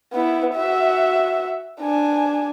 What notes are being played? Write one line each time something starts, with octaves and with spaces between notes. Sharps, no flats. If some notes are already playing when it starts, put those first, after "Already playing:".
B3 E4
F#4 E5
D4 G#5